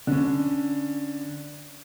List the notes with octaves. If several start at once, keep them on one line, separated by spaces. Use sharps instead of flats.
D3 C#4